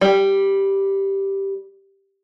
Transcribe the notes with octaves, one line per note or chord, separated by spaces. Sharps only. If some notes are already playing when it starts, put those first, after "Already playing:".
G3